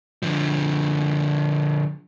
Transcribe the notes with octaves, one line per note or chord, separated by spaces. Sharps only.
D3 F3